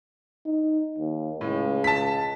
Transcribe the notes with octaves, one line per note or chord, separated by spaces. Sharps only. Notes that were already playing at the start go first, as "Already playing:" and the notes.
D#4
D#2
C#2 A2
A5 B6